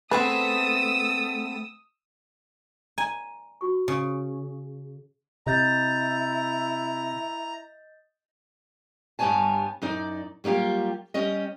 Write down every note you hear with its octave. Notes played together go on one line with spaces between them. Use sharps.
A3 B3 C4 G#4 B4 D#6 E6
D5 G#5 A#5
F#4 C#6
C#3 C#5
C3 E4 D#5 A#5 G6 A6
G2 G3 B3 C#5 G#5 A5
F#2 D#4 D5
F#3 G3 A#3 F4 G4
G3 C#4 D#5